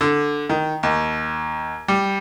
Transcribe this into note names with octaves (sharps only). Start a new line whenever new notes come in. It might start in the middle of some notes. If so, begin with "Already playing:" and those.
D3
D#3
D#2
G3